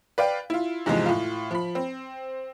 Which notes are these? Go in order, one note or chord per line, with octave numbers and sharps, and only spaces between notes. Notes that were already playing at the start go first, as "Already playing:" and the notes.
B4 D5 F5 G5
E4 F4
E2 G#2 C3 E3 F3 G#3
A2 F4
F3 B5
C4